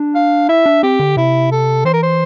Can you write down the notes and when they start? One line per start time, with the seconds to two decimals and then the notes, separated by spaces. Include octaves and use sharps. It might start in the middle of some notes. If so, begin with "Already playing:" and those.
Already playing: D4
0.15 F5
0.49 E4 E5
0.66 D4
0.83 C4 G4
1.00 D3
1.17 C3 E4
1.51 A4
1.85 E3 C5
1.93 A#4
2.03 C5